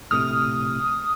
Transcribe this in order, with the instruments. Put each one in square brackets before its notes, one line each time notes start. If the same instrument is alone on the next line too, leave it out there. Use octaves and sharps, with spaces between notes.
[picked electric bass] A#1 A2 C3 [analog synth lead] D#6 [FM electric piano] F6